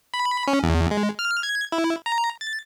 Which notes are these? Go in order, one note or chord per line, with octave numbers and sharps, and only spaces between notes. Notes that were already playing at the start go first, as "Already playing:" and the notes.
B5
C#4
E2
G#3
F6
G#6
E4
A#5
A6